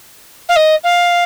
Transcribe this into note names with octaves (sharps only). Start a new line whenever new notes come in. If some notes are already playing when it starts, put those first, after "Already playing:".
F5
D#5
F5